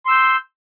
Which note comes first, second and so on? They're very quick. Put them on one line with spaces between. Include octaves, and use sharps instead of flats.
C6 E6 G6